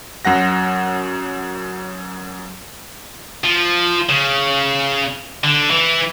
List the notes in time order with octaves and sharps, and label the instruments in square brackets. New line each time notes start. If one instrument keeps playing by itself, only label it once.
[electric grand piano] F#2 F#3 F#5 A#6
[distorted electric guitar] F3
C#3
D3
E3